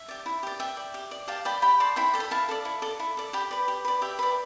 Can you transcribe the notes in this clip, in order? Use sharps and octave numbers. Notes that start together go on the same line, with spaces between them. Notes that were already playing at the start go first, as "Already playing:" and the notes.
Already playing: E5
G4 D5
E4
G4 D5
G4 E5 G5
D5
G4
D5
G4 F5 A5
D5 G5 B5
G4 G5 B5
D5 A5 C6
E4 G5 B5
A4 D5
B5
E4 F5 A5
A4 D5
E4
A4 D5
E4
A4 D5
G4 G5 B5
B4 D5
G4
B4 D5
G4 E5 G5
B4 D5